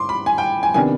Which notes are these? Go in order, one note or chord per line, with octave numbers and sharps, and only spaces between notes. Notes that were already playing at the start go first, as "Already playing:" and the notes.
Already playing: G2 C6 D6
B5
G#5
G5
G#5
C3 D#3 B3 D4 G#5